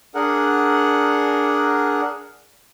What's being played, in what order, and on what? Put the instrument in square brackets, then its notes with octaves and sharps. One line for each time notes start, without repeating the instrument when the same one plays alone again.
[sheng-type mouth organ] D4 G#4 A#4 F#5